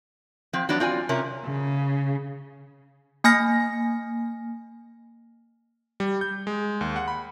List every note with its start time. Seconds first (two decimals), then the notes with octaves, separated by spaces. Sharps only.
0.53 F3 C4
0.69 F#3 B3 D4
0.80 C4 F4 D5 G#5
1.09 C3 C#4 A#4
1.44 C#3
3.24 A#3 G#5 F6 A#6
6.00 G3
6.21 G6
6.47 G#3
6.81 D#2
6.96 F#5
7.08 B5